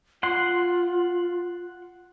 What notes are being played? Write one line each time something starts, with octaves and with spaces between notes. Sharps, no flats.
F4 F#5 C6